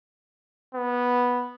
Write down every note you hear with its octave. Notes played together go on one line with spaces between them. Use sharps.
B3